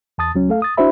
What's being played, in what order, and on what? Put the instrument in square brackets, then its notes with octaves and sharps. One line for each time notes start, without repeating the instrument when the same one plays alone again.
[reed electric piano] E2 A5 D#6 A6
C#2 F#3 C#4
A3 A4 F5
D#6 A6
D4 E4 F#4 C5 E5 B5